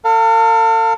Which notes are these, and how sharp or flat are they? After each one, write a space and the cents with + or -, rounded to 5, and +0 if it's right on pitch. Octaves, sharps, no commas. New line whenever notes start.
A4 +40 F5 +0